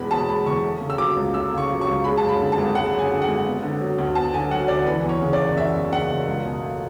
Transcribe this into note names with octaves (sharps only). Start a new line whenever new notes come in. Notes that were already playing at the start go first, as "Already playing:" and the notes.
Already playing: E2 B2 G#3 B3 B5
B2 A5
G#3 B5
E2 C#6
A3
C#3
E6
F#3 D6
C#2
A3 E6
C#3
C#6
F#3
C#6
C#2
G#3 B5
F#2 A5
B5
D3
A5
G#1
G#3 F#5
F#2
G#5
D3
F#5
G#1
B3
D3
F#3
D2
B3 A5
D3 G#5
F#3 F#5
D2 D5
E3 B4
E2
C#5
C#3
D5
F#1
E3 E5
E2
C#3 F#5
F#1
C#2
B2
A3